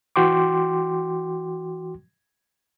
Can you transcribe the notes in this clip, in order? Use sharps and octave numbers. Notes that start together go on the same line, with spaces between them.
E3 F#4 G5 C6 D6